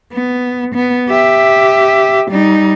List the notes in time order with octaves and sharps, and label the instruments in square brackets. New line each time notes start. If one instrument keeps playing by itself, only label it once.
[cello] B3
B3
G4 E5
G3 D#4